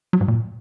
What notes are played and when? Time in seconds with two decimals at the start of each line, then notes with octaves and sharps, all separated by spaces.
0.13 F#3
0.21 G#2
0.28 A#2